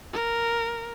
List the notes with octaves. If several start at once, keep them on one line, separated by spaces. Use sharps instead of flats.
A#4